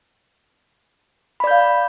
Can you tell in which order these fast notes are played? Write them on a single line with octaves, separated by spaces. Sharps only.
B5 D5 G6 F5